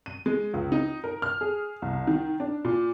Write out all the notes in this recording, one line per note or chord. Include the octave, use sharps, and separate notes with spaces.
D#7
G#3
C#2
D#4
A#4
F6
G#4
C2
D#3
D4
A#2